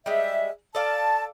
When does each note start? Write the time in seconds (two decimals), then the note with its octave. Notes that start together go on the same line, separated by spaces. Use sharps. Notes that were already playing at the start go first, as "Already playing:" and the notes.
0.06 G3 G#3 E5
0.75 A4 D5 F5 A5